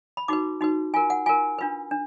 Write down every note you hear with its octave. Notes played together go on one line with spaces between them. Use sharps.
B5
D#4 F#4 B4 D6
D#4 F#4 B4
F4 A#4 G#5
F#5
F4 A#4 G#5
D4 F4 B4
D4